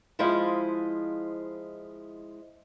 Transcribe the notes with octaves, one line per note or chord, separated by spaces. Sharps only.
F3 G#3 E4 C5 D#5 F5